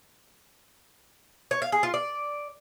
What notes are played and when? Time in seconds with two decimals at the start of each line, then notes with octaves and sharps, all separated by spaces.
1.51 C#5
1.62 F5
1.72 G#4
1.83 F4
1.94 D5